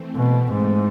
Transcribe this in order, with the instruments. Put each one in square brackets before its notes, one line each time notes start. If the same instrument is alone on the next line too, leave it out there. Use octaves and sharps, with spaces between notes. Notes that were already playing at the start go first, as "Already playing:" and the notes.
Already playing: [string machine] E3 A3 C4
[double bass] B2
G#2